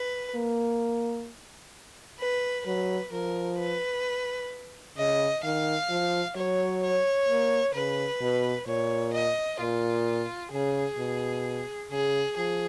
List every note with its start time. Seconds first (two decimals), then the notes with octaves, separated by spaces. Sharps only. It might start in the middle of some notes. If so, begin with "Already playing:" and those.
Already playing: B4
0.35 A#3
2.20 B4
2.66 F#3 B4
3.12 F3 A#4
3.59 B4
4.97 C#3 D#5
5.44 D#3 F5
5.90 F3
6.36 F#3 C#5
6.83 C#5
7.28 A#3
7.74 C#3 B4
8.21 B2
8.67 A#2 C#5
9.13 D#5
9.60 A#2 F4
10.53 C#3 G#4
10.98 B2
11.91 C#3 G#4
12.37 F3 G#4